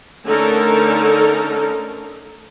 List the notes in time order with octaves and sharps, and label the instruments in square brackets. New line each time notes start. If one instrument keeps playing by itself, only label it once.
[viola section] D3 A3 C#4 D#4 A4 A#4